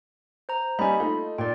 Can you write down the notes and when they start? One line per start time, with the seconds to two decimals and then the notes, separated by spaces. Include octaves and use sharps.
0.49 C5 A#5
0.79 G3 A#3 C#4 D#5 G#5 B5
1.00 A3 D#4 F4
1.38 A#2 D5 G5